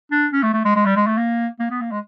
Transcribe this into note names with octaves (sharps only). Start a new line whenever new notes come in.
D4
C#4
A3
A3
G#3
G#3
G3
G#3
A3
A#3
A#3
B3
A#3
G#3